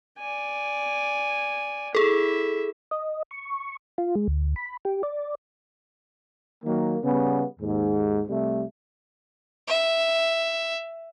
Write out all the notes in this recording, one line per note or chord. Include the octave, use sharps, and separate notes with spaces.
D5 G#5
E4 G#4 A4 E5
D#5
C#6
F4
G#3
D2
B5
G4
D5
D#3 F#3 A#3
C#3 G3 B3
D#2 G#2
C2 C3 G3 A3
E5